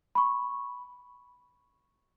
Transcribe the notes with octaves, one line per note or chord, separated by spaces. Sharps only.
B5 C#6